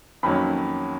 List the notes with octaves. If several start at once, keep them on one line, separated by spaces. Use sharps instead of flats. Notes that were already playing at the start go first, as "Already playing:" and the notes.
F2 D#3 F#3 A#3 C#4 B5